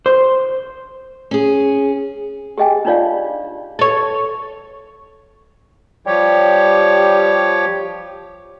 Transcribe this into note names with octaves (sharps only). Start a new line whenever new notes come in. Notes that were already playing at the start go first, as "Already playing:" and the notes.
C5
C#4 G#4
G4 G#4 D#5 G5 G#5
D4 D#4 F4 C#5 D5 F5
A4 C#5
F3 G3 G4 C#5